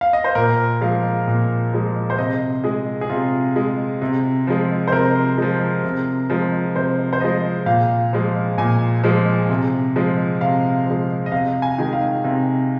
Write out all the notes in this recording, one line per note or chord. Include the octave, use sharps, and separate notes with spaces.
F5
D#5
C5
A#2 A#4
F3 G#3 F5
A#2
F3 G#3
C5
C3 D#5
G#3 G#4
G#4
C3 F4
G#3
C3
F3 G#3
C5
C3 A#4
F3 G#3
C3
F3 G#3
C3 C5
C5
F3 G#3 D#5
A#2 F5
F3 G#3
A#2 G#5
F3 G#3
C3
F3 G#3
C3 F5
F3 G#3
D#5
C3 F5
G#5
D#3 G#3
F5
C3